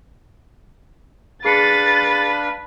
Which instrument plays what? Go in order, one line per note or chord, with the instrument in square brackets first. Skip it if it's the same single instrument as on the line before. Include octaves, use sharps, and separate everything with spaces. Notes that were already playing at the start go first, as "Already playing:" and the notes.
[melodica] D4 F5 [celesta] G#4 C7 C#7 [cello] B4 [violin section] A6